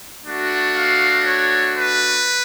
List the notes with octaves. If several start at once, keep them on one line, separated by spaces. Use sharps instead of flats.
A3 D4 F#4
F5
C#5
B4